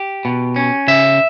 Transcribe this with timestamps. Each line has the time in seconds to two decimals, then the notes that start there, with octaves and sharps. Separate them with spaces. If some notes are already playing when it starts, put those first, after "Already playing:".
Already playing: G4
0.25 B2
0.56 C#4
0.88 C#3 E5